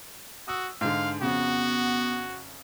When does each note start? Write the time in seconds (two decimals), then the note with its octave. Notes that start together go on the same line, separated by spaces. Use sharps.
0.48 F#4 D#6 E6
0.81 G#2 D3 F5
1.22 F2 C#3 B3 F#4